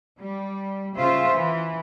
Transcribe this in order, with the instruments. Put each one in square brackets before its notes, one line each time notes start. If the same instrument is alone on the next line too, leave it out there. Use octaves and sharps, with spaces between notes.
[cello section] G3
C#3 F4 C5 E5
E3